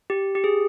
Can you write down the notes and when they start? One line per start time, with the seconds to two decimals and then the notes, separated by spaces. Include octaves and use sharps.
0.10 G4
0.35 G4
0.44 G#4